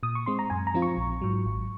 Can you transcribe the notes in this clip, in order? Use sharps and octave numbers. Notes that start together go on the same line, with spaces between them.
A#2 D#6
C#6
G#3 C4 C6
A#5
F#2 G#5
A#5
F3 C4 F4
C#6
A#1
G#2 F#3
G#1